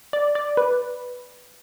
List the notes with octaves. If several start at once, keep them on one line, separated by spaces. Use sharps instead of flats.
D5
D5
B4